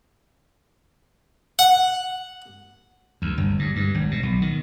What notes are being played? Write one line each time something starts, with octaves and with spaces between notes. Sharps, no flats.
F#5
D2
G1
G2
G2
G#1
B2
B1
D#3